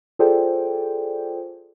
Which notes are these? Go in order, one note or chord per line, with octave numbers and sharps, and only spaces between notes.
F4 G#4 A4 C5 D5 G5